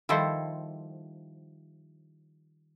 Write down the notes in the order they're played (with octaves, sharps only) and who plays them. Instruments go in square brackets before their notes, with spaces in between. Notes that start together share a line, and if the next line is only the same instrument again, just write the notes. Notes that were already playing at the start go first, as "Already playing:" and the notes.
[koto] D#3 F3 G3 E4 A4 C5